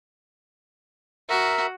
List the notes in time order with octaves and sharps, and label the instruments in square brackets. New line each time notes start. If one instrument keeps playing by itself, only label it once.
[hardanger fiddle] F#4 [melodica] A#4 E5